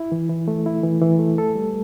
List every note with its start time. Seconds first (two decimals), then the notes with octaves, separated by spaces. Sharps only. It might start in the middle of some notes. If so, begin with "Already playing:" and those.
Already playing: E4
0.12 E3
0.29 E3
0.48 A3
0.66 E4
0.84 E3
1.02 E3
1.19 A3
1.38 A4
1.55 G3